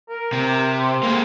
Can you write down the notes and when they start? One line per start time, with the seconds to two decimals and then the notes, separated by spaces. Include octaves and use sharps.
0.09 A#4
0.33 C3
0.78 C5
1.03 G#3 A#3